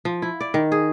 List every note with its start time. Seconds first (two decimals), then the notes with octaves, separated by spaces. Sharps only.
0.05 F3
0.22 E4
0.41 D5
0.54 D#3
0.72 G#4